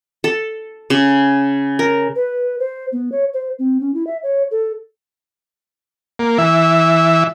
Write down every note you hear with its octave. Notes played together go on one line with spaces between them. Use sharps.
A4
C#3
A#4
B4
C5
B3
C#5
C5
C4
C#4
E4
E5
C#5
A4
A#3
E3 E5